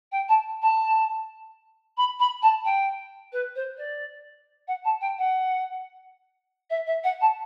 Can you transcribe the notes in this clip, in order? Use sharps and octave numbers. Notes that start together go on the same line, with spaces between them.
G5
A5
A5
B5
B5
A5
G5
B4
C5
D5
F#5
A5
G5
F#5
E5
E5
F#5
A5